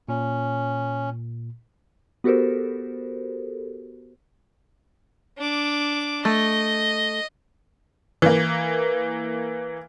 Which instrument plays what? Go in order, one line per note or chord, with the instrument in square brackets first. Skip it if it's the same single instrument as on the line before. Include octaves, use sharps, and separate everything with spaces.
[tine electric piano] A#2 [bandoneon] C#4
[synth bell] B3 F#4 G4 A4 A#4 C5
[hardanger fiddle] D4 D6
[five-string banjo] A3 [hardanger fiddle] D#5
[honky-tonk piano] E3 A#3